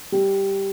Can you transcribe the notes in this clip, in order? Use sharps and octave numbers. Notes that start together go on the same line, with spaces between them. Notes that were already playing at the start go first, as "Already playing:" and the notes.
G3